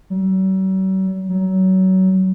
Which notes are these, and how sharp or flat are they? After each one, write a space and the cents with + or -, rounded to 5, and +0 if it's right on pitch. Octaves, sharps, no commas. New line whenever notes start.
F#3 +45
F#3 +25